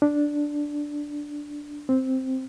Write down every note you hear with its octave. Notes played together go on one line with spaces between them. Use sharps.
D4
C4